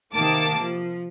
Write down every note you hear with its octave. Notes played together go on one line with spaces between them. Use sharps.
C3 D#3 A#3 A5 D6
F3